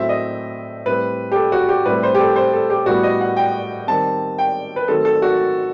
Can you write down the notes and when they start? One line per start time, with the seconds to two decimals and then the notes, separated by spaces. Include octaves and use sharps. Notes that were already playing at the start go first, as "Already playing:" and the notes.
Already playing: A2 F#3 A3 C4 E5
0.09 D#5
0.86 A2 G3 C4 B4
1.32 G4
1.35 A4
1.52 F#4
1.69 G4
1.86 A2 G3 C4 B4
2.03 C5
2.15 G4
2.20 A4
2.36 C5
2.53 A4
2.70 G4
2.86 A2 G3 B3 F#4
3.03 D#5
3.21 F#5
3.37 G5
3.87 D#3 G3 C4 A5
4.38 G5
4.76 B4
4.88 D#3 F#3 A3 C4 A4
5.05 A4
5.22 F#4